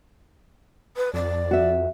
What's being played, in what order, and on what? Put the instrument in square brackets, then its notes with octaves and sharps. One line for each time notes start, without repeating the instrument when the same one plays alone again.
[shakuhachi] B4
[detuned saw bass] F2 [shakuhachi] D5
[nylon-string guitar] F#4 E5